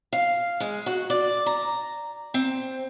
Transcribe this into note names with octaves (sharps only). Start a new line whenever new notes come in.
F5
G#3
F#4
D5
A#5
C4